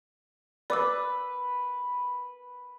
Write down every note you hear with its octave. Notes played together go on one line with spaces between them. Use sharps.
B4 D5 D6 E6